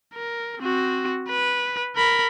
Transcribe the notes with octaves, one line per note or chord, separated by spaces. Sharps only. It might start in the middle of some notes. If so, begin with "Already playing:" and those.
A#4
C4 F#4
B4
A#4 B5